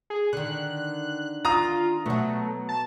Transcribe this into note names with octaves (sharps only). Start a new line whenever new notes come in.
G#4
D3 D#3 F#6
F4 A#5 D#6
B2 F#3 A3
A5